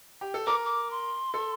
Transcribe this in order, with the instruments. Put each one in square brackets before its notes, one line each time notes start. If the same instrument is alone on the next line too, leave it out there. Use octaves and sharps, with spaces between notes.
[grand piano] G4
A4
[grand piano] A#4 [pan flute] D6
[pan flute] D6
C6
[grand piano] A4